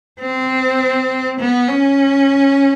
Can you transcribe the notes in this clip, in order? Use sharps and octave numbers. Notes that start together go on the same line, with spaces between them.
C4
B3
C#4